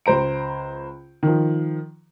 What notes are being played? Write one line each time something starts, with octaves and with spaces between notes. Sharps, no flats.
C#2 C5 A#5 D7
D#3 F3